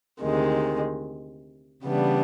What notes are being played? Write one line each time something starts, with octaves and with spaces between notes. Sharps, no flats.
D2 C3 D#3 G#3
C#3 E3 G3 B3 D4